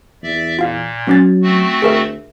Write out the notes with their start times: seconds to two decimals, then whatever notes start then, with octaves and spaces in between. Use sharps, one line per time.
0.23 E2 D5 E5
0.59 A#2 F4 F5
1.07 F#3 B3 C#4 A6
1.42 A3 C4 F#4
1.82 D2 G#4 A#4 E5